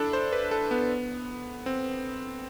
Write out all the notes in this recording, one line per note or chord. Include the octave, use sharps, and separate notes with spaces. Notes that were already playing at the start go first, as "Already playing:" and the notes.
Already playing: D4 E4 A4
C5
B4
A4
B3
C4